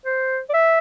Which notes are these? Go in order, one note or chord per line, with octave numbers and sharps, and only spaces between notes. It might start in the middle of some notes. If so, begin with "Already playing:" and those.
C5
D5
E5